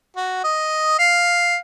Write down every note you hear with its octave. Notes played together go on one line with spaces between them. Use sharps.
F#4
D#5
F5